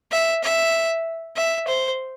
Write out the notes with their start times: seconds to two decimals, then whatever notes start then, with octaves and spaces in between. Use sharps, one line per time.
0.12 E5
0.43 E5
1.36 E5
1.67 C5